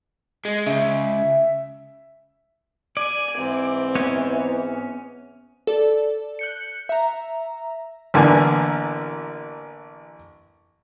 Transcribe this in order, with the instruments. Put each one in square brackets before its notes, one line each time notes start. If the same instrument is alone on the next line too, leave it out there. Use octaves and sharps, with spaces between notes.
[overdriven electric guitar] G#3 [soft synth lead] D#5
[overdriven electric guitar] C#2 C#3 [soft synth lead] E5
[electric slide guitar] D5 [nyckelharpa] G#5
[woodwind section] G#2 E3 [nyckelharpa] C4
[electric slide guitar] B3 C#4 C#5
[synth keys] A4 D5
F#6 G6 C#7
E5 A#5
[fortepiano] A1 D3 A#3 B3 G#5